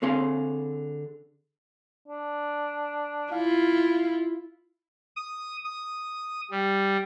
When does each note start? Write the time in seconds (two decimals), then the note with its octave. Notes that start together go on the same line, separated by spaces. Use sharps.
0.02 D3 C4 G#4 F5 C6
2.08 D4
3.32 E4 F4 F5
5.16 D#6
5.64 D#6
6.51 G3